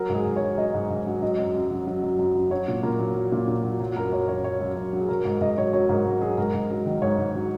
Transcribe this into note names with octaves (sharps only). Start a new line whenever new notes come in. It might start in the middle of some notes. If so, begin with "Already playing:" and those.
Already playing: F#3 A#4
G#2
G#4
G#2
C#5
F#3
F#3 D#5
G#2
G#2
F#3
F#3 D#5
F#2
F#2
F#3
F#3
F#2
F#2
F#3
F#3 C#5
A#2
A#2 A#4
F#3
F#3
A#2
A#2
F#3
F#3
F#2 A#4
F#2 C#5
F#3 C#5
F#3 C#5
F#2
F#2
F#3
G#4
F#3 A#4
G#2 A#4
G#2 D#5
F#3 C#5
F#3 C#5
G#2 A#4
G#2 F#4
F#3 G#4
G#2 A#4
G#2
F#3
D#3
G#2 C#5
G#2
F#3